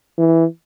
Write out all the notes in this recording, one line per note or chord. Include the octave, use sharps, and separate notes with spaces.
E3